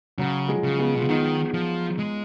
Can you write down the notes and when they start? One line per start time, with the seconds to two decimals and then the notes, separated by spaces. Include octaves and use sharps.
0.18 C#3 F#3
0.48 F3 G#3
0.63 C#3
0.79 G#3 B3
0.95 B2
0.99 C#3 F4
1.09 D#3 B3 D#4
1.54 F3
1.99 G#3